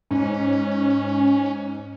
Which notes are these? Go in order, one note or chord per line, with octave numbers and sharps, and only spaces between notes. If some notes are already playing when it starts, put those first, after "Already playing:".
G#2 C#4